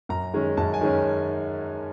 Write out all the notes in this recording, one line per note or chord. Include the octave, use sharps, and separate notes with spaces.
F#2 A#5
D#3 G#3 C#4
F#2 A5
G#5
D#3 G#3 C#4